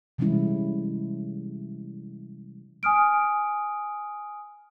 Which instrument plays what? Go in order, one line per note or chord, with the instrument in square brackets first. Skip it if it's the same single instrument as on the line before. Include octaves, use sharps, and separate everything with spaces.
[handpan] C3 E3 G3 G#3 C#4 E4
[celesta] G#5 D#6 F6 D7